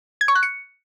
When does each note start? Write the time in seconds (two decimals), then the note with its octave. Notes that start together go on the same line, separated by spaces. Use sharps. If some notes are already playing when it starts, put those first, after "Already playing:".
0.21 G#6
0.28 C#6
0.35 F#6
0.43 C#7